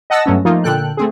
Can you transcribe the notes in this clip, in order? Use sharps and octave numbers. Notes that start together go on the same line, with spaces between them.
D#5 F#5 A5 E6 A#6
G2 F#3 A3 B3 C#4
F3 A3 A#3 D#4 F4
A#2 D3 A4 G5 F#6
A3 C4 G#4